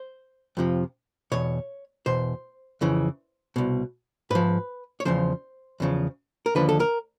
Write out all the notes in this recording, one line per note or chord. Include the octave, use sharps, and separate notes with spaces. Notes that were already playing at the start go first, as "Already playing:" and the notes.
Already playing: C5
F2 C3 F3
E2 B2 C#5
E2 B2 C5
F2 C#3 E3
C2 B2
G#2 F3 B4
C#5
E2 C#3 F3 C5
E2 C#3 F3
A#4
D#2 D3 F3 B4
A4
A#4